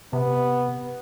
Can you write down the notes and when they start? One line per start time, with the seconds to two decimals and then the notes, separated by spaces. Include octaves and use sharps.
0.13 C3 B3